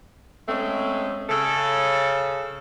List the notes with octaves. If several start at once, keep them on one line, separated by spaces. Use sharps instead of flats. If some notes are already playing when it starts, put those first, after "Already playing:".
G#3 A3 C4 C#4
C#3 A4